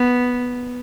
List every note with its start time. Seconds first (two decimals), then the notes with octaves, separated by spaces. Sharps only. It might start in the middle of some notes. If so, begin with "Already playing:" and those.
Already playing: B3